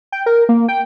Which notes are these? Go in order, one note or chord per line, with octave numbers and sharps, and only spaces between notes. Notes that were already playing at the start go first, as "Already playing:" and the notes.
G5
A#4
A#3
G5